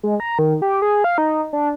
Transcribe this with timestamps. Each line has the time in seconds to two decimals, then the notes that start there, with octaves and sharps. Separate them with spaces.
0.03 G#3
0.20 A#5
0.39 D#3
0.62 G4
0.82 G#4
1.04 F5
1.18 D#4
1.53 D4